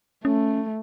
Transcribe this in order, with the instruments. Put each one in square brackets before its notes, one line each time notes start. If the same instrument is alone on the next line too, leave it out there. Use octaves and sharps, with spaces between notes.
[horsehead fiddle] A3 [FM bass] C#4